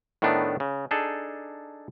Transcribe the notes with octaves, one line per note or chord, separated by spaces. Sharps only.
A2 D#3 A3 B3 D4
C#3
D4 D#4 G#4 A4